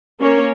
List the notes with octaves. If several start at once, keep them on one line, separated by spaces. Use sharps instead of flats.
A#3 C#4 A#4 C#5